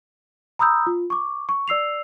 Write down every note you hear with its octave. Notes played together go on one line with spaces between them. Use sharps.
A#5 B5 D#6 E6 G6
F4
C#6 D6
C#6
D5 E6 C7 F7